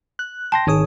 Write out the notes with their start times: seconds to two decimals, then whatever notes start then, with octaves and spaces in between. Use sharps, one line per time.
0.19 F#6
0.52 G5 A5 C6 A#6
0.67 G#1 D#3 G#4 C#5 D#6